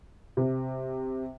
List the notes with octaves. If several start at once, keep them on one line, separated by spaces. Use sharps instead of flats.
C3